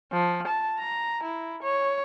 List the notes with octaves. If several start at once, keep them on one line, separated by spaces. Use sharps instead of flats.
F3
A5
A#5
E4
C#5